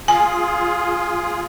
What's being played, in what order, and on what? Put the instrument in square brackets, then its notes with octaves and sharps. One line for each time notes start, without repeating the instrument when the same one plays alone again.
[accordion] F4 G#4 [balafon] G#5